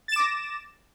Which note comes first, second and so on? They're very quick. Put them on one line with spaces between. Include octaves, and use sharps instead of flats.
A6 E7 D6 A#6